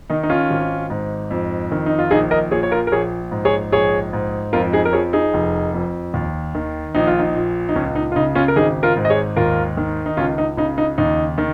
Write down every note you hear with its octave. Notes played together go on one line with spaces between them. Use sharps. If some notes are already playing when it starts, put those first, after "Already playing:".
D#3 D#4
D#4
C#4 F4
G#1
G#2
F2
D#3
D#4
F4
A#1 D#4 G#4
A#4 D#5
A#2 G#4 C#5
C#5
F4 A#4
A#4
A#1 G#4 C#5
G#2
G#4 C#5
A#1 G#4 C#5
G#2
F2 F4 A#4
D#4 G#4
A#4
F3 G#4 C#5
D#4 G#4
F1
F2
D#2
D#3
A#1 D#4
F4
D#4
A#2
D#4
C#2 C#4
D#4
F4
C#3 D#4
C#4 F4
A#4
G#1 D#4 G#4
F4 A#4
G#2
D#5
G#4 C#5
D#2 F4 A#4
D#3
D#4
C#2 C#4 F4
D#4
C#3 D#4
D#4
D#2 D#4
D#3